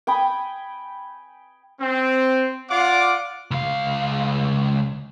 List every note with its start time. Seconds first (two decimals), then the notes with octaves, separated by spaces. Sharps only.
0.07 G5 G#5 B5 D#6
1.80 C4
2.69 F4 D5 F5 F#5 D6
3.51 C#2 F5